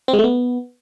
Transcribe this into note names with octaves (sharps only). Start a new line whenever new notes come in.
C4
G#3
A3
B3